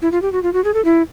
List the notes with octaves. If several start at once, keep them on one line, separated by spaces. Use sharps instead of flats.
E4
F4
G4
F#4
F4
F#4
G#4
A4
E4